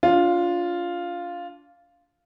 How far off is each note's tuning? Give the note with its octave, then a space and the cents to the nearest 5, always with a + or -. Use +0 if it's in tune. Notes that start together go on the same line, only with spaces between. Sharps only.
D4 -35 F4 +0